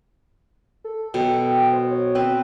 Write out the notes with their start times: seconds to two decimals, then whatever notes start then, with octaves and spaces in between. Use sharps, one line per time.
0.84 A4
1.14 B2 F#3 A4 G5
1.73 C5
1.91 C#5
2.15 C4 B4 G5